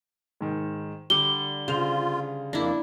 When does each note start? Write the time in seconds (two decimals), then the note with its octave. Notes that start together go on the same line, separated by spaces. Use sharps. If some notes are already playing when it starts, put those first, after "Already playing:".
0.41 G#2 D#3
1.10 D3 G3 D6 G7
1.68 C#3 F4 C5 F7
2.53 F2 A#3 D4 E4